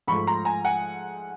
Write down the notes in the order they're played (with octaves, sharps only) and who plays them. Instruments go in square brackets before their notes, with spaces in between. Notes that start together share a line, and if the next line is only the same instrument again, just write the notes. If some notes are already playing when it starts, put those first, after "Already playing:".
[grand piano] G#2 F3 A3 B5 C#6
A#5 C6
G#5 A#5
F#5 G#5